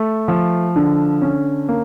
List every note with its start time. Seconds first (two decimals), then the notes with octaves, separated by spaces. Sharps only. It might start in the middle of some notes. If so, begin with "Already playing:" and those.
Already playing: A3
0.28 F3
0.76 D3
1.22 C#4
1.69 A#3